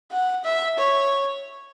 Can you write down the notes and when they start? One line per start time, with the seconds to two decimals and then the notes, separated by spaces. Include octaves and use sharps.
0.11 F#5
0.45 E5
0.78 C#5